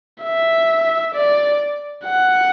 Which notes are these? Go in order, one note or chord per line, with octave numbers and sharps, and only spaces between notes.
E5
D5
F#5